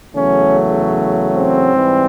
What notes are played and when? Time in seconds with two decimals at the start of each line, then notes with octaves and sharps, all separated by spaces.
0.15 E2 C#3 F#3 A3 C#4
1.33 C4
1.73 G#2 E3 G3